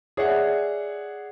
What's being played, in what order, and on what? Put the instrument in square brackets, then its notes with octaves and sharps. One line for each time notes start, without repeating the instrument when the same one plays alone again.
[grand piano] G#4 C#5 D5 E5 F#5